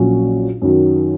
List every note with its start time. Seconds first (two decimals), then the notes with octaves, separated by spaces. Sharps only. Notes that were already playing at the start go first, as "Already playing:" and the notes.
Already playing: A#1 A#2 F#3 C#4
0.62 F#2 D#3 F#3